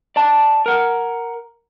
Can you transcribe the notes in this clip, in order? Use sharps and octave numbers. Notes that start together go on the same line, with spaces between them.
D5 A5
A#4 F#5